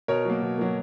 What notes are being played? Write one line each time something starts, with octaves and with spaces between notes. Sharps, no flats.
B2 A#4 C#5
F#3 A#3
B2
F#3 A#3